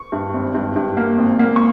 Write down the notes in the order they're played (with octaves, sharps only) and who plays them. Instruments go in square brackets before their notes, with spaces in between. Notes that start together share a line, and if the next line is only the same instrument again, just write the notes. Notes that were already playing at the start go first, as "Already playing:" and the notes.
Already playing: [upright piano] C#6
G2
G#1
G2
G2
A#3
G#1
A#3
C#6